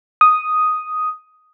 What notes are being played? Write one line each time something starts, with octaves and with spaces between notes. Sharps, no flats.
D#6